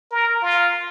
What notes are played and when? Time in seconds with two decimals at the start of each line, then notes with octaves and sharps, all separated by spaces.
0.11 A#4
0.42 F4